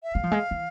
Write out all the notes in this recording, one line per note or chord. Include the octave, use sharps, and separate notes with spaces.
E5
G#3 F5
F3
G#3
E3